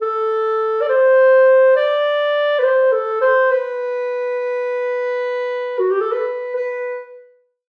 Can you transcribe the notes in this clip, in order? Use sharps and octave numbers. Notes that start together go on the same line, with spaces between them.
A4
D5
C5
D5
B4
C5
A4
C5
B4
F#4
G4
A4
B4
B4